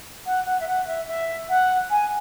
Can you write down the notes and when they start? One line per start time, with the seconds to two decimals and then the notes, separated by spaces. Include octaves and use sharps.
0.26 F#5
0.45 F#5
0.60 E5
0.67 F#5
0.87 E5
1.08 E5
1.49 F#5
1.90 G#5